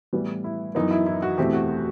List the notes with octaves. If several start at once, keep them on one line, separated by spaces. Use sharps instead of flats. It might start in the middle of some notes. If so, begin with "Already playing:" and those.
A2 E3 G3 B3
E4
F#2 E3 B3 D#4
E4
E4
F#4
E2 B2 A3 C4 G4
F#4